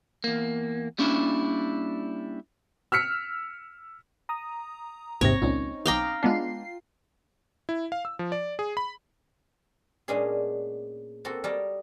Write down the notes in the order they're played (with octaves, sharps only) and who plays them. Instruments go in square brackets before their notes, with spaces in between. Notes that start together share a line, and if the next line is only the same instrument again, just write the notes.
[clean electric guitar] E2 A#3
G3 A#3 C#4 D4 E4
[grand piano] E6 F6 B6 C#7
[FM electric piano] A#5 D#6
[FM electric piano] A1 C4 A#6 [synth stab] D#2 G#2 C3 [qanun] C#5
[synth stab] C#2 A#2 [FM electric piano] C4 C#4 D#4
[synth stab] B1 D6 D#6 [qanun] F5 G5 A#5
[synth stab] G#3 B3 D4 [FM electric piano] F4 C7
[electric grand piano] E4
F5
E6
F3
D5
G#4
B5
[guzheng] A#2 G#3 B3 C#4 D4 G#4
A#3 C4 F#4 A4
G3 A#4 C#5 D#5 G5 A5